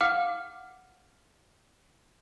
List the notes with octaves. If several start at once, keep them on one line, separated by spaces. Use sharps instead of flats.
F5 F#5 D6 F6